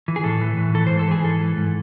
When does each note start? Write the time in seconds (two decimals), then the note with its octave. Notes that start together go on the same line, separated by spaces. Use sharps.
0.08 E3
0.16 G#4
0.24 A2 A4
0.41 E3
0.57 A2
0.74 E3 A4
0.87 G#2 C5
0.99 A4
1.08 E3 G#4
1.24 G#2 A4
1.41 E3
1.57 G#2